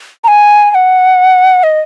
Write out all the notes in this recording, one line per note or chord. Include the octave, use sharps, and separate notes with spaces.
A#5
G#5
G#5
F#5
D#5